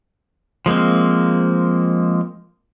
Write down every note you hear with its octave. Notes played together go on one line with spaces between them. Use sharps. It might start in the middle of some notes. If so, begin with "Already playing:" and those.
F3 G#3 A#3 C4